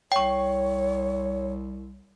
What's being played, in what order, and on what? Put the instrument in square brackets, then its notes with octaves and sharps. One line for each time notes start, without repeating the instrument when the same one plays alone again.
[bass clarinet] C2 [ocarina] C#5 [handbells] G5 C#6